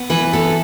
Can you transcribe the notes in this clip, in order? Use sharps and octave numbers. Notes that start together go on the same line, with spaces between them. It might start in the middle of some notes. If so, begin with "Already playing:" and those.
Already playing: B3
E3 B4
B3 A4